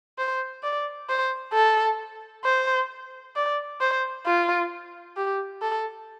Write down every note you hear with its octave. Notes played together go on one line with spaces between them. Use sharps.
C5
D5
C5
A4
C5
D5
C5
F4
G4
A4